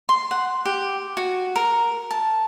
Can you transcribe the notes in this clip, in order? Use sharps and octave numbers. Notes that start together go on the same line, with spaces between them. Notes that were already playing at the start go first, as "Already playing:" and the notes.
C6
F#5
G4
F#4
A#4
A5